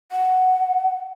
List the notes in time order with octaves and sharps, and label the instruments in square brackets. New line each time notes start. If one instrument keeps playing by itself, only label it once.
[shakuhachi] F#5